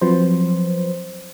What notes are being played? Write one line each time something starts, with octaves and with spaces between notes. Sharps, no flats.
F3 F#3 C4 B4 C5